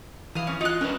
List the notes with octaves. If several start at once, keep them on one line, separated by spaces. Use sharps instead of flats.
E3 F5 D#6
C#4
D#4 F4 F#6
C#4 D4 A#4 B4